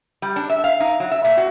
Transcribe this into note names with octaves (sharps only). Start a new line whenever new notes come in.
G3
D4
E5
F5
D#4
F#3
E5
A#2
F#4